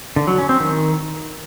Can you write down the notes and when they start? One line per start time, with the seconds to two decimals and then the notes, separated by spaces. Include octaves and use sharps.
0.16 D3
0.27 F#3
0.38 C#4
0.49 C4
0.60 D#3